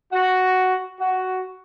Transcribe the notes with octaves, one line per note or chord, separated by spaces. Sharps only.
F#4
F#4